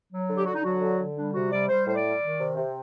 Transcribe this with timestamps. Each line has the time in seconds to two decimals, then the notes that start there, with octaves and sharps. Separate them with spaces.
0.11 F#3
0.29 D3
0.37 G4
0.46 D3 F#4
0.55 D#4
0.63 F#3 F#4
0.81 D3
0.99 D3
1.16 G3 D4
1.34 C3 F#4
1.51 G3 D5
1.69 G3 C5
1.86 A2 C5
1.95 D5
2.04 G3
2.22 D#3
2.39 C3
2.57 C3